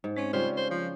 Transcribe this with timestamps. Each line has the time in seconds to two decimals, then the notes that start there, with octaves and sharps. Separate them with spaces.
0.04 G#2
0.17 G#3 C4 C#4
0.33 C#3 G3 C#4 F4 C5
0.57 C5
0.70 F3